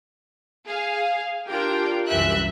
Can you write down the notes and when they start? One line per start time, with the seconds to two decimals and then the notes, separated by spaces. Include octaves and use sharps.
0.67 G#4 F5
1.49 D4 F4 G4 A#4 G5
2.08 C2 F#2 E3 E5 F#6